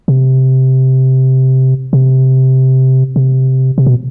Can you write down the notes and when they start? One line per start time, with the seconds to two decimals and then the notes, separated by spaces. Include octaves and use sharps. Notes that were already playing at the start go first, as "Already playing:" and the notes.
0.08 C3
1.93 C3
3.16 C3
3.78 C3
3.86 B2